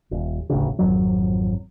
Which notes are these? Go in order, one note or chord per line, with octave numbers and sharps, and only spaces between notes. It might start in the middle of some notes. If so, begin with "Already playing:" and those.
D#1
E1 A1 D2 C#3
G#1 F2 F#3